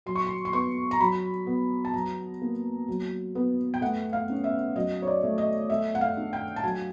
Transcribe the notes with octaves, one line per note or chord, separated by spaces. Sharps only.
F#3 C6
C#6
C6
C6
B3 C#6
A#5
F#3 B5
B3
A5
F#3 A#5
A#3
F#3
B3
G5
A3 F#5
F5
C#4
E5
F#3 D#5
C#5
D5
A3
D#5
A3 E5
F#5
F5
D4
G5
A5
F#3 G#5